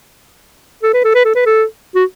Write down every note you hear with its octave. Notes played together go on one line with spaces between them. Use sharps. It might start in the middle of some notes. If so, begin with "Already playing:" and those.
A4
B4
A4
B4
A4
B4
A4
F#4